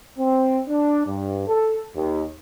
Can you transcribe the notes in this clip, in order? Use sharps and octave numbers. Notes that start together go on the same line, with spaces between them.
C4
D4
G2
A4
D#2